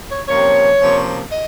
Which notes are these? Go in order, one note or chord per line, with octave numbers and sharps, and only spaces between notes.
C#5
C3 F3 A#3 C#4 C#5
C3 F3 A#3 C#4
D#5